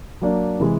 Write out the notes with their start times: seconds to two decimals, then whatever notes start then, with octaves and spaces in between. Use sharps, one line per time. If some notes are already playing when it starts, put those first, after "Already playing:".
0.22 F#3 A#3 D4
0.59 C3 E3 G#3